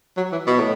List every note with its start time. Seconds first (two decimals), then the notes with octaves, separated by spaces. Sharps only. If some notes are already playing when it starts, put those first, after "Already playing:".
0.17 F#3
0.32 E3
0.47 B2
0.59 A2